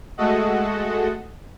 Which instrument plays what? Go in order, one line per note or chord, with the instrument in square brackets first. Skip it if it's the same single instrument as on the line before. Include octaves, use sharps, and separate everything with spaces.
[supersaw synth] G#3 A3 F#4 A4 D#5 F#5